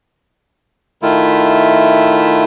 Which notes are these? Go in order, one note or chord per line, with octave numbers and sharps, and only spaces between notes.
D#3 A3 E4 F4